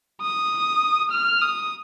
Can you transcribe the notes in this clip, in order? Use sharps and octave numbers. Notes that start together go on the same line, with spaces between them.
D#6
F6
D#6